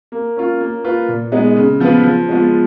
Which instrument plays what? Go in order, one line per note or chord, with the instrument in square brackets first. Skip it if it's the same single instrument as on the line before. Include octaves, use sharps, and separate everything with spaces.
[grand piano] A#3
C#4 F4
A#3
F4 B4
A#2
G#3 B3 D#4 G#4
C#3
F3 B3 F4 B4
F3
G#3 B3 F4